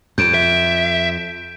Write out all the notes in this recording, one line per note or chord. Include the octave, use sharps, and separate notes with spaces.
F2 G6 D7 E7
E5